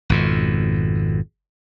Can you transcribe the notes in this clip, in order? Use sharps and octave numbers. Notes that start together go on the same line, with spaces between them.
G#1 F2 B2